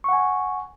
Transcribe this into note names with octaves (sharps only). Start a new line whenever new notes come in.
F#5 G#5 C#6